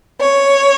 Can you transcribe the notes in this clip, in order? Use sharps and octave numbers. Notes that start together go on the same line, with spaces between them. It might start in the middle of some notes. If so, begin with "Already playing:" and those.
C#5